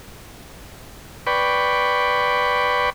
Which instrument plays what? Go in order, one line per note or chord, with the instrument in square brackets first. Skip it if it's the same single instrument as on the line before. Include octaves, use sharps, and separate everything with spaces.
[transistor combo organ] B4 D5 G5 B5 C#6